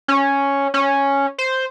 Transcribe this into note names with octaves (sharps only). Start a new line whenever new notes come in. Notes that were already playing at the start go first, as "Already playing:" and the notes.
C#4
C#4
C5